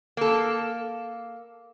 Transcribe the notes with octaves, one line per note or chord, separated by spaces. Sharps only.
A#3 A4